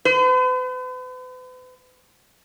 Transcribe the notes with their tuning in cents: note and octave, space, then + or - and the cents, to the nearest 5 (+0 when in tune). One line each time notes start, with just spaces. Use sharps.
B4 +45